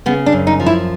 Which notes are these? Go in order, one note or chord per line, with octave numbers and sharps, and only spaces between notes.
C#3 B3
D4
F#2
D#4
F3
E4